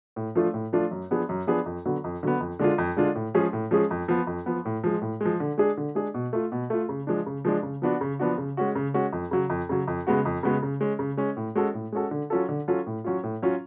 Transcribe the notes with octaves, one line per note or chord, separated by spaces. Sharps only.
A2
F3 A3 D4 F4
A2
F3 A3 D4 F4
F#2
F3 B3 D4 G#4
F#2
F3 B3 D4 G#4
F2
D3 F#3 B3
F2
D3 F#3 B3
F2
D3 G#3 D4 F4
F2
D3 G#3 D4 F4
A2
F3 G#3 C#4 G#4
A2
F3 G#3 C#4 G#4
F2
F3 B3
F2
F3 B3
A2
F3 G#3
A2
F3 G#3
D3
G#3 D4 G#4
D3
G#3 D4 G#4
B2
A3 F4
B2
A3 F4
C#3
F3 G#3 D4
C#3
F3 G#3 D4
C#3
F3 B3 D4 F#4
C#3
F3 B3 D4 F#4
C#3
G#3 C#4 F#4
C#3
G#3 C#4 F#4
F2
C#3 F#3
F2
C#3 F#3
F2
C#3 G#3 B3 F#4
F2
C#3 G#3 B3 F#4
C#3
G#3 C#4
C#3
G#3 C#4
A2
G#3 C#4 F#4 A4
A2
G#3 C#4 F#4 A4
D3
F#3 C#4 F4 A4
D3
F#3 C#4 F4 A4
A2
F#3 C#4 F4
A2
F#3 C#4 F4